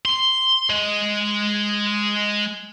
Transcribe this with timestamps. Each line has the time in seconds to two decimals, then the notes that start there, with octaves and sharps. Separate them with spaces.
0.05 C6
0.70 G#3